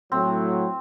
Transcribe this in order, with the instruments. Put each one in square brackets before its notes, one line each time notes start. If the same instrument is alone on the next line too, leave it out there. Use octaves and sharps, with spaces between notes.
[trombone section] A2 F#3 [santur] C4